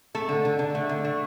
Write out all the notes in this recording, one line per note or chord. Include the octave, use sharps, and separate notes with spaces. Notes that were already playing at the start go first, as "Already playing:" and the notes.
A3 A4
D3
D3
D3
A3
D3
A3